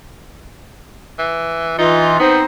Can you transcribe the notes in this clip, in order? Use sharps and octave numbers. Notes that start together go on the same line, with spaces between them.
E3
E3 D#4 F4
B3 C4 D#4 C5